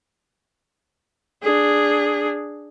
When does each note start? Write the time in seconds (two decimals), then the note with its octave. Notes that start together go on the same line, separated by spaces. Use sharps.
1.43 D4 G#4